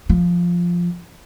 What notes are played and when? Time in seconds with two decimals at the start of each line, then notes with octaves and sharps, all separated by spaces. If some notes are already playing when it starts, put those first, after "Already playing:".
0.09 F3